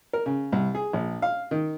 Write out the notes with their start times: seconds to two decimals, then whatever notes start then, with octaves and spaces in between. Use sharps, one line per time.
0.13 A#4
0.26 C#3
0.52 C2
0.75 G#4
0.93 A#1
1.22 F5
1.51 D#3